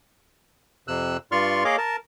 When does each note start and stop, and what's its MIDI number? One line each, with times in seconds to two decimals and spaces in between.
0.88 1.17 41
0.88 1.17 48
0.88 1.17 88
0.88 1.17 90
1.32 1.64 43
1.32 1.64 65
1.32 1.64 74
1.32 1.64 84
1.32 1.64 85
1.32 1.64 89
1.65 1.76 58
1.65 1.76 68
1.65 1.76 73
1.65 1.76 75
1.65 1.76 77
1.65 1.76 86
1.78 1.96 70
1.78 1.96 81